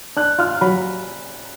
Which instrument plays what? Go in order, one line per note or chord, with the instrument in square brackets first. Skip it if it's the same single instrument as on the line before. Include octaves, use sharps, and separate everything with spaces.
[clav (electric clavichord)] D4 [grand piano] F#6
[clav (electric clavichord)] F4 [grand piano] F6
[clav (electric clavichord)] F#3 [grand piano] B5